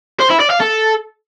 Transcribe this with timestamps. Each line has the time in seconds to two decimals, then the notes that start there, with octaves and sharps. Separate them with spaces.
0.20 C5
0.30 E4
0.40 D5
0.50 F5
0.60 A4